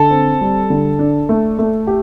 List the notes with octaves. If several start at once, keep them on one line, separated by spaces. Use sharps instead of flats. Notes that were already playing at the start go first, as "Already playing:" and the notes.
Already playing: D3 A4
C4
G3
D3
D4
A3
A3
G4